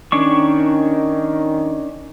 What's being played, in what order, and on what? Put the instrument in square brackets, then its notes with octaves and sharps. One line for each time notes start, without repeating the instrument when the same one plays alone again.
[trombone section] D#3 [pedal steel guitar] C#4 D4 C#6